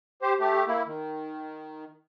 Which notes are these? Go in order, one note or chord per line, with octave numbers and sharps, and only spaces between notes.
G4 C5
A3 G4
A#3 E4
D#3